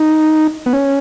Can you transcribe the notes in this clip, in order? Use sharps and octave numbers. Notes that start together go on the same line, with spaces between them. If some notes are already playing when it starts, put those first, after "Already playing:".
Already playing: D#4
B3
C#4